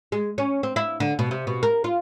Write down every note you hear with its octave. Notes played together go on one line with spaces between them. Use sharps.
G#3
C#4
C4
E4
D3
B2
C3
B2
A#4
F4